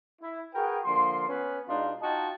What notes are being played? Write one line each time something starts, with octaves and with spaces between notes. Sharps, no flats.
E4
F#4 G#4 A#4 B4 G5
D3 F3 A#3 C6
B3 C#4 B4
B2 G#3 D4 D#4 F4
D#4 F4 F#4 D#5 G5 A5